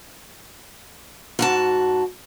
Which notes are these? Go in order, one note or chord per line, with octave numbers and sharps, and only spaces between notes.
G#2 F#4 A5